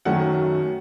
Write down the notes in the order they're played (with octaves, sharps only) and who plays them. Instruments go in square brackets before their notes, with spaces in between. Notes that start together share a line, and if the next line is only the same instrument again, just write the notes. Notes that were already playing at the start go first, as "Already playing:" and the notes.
[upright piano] F#2 D#3 F#3 A3 C#4 F#5